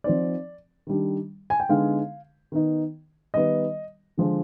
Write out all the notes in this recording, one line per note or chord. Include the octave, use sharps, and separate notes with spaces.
F3 C4 D#4 D5
D#3 G3 D4
G#5
G5
D3 G#3 B3 D#4 F5
D#3 B3 D#4
D#3 G3 B3 D#5
D3 F3 G#3